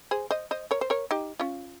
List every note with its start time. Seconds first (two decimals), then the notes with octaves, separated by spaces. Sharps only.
0.11 G#4 C5
0.31 C5 D#5
0.51 C5 D#5
0.71 A#4 C#5
0.81 C5
0.90 A#4 C#5
1.11 D#4 G4
1.40 C#4 F4